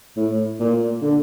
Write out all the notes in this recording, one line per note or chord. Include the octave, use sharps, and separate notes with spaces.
A2
A#2
D3